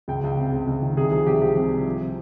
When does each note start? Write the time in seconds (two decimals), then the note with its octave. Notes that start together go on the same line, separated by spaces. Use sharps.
0.08 C#2 G5
0.24 C#2
0.38 C3
0.52 C#2
0.67 C#2
0.82 D#3
0.97 C2 G#4
1.12 F3 G#4
1.26 C2 G4
1.41 F3 G4
1.56 C3
1.71 C3
1.86 F3